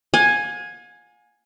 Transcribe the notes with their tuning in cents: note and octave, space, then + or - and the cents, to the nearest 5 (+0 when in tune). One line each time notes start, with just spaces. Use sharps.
F5 +45 G#5 +0